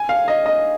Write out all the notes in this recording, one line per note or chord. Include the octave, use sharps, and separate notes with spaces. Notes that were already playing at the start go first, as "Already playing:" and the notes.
Already playing: G#5
F5
D#5
D#5